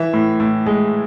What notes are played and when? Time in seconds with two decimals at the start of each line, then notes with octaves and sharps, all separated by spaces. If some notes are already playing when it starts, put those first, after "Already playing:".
Already playing: E3 E5
0.13 A2
0.40 A2
0.66 G#3